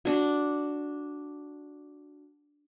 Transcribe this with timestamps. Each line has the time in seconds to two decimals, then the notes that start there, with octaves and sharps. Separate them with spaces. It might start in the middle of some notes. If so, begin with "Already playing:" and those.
0.05 D4 F#4